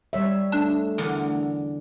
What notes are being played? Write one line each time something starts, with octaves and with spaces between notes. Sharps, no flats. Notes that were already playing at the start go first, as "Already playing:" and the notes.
G3 C#5 E5
A3 D4
E2 D3 A#4